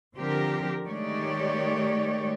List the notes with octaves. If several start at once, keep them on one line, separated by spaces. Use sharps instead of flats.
D3 F3 C4 G4 A#4
D#3 G#3 A3 G4 C#5 D5